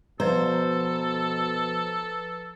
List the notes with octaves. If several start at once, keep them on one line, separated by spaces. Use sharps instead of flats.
B2 F3 A4 B4 C5 A#5